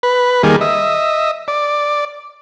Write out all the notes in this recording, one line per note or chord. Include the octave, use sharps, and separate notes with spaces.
B4
D#3 G3 A#3 G#4
D#5 E5
D5